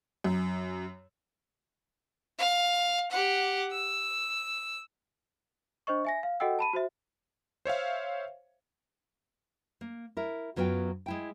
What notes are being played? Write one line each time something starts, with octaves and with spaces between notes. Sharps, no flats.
F#2
F5
G4 F#5
E6
D4 C5 D#5 C#6
E5 G#5 A#6
F5
F#4 A4 D#5 F#5 G5 E6
A5 B5 D#7
F#4 C5 E5
C5 C#5 E5 F5
A#3
E4 A#4
F#2 F#3 B3 F4 G5
G#3 E4 G5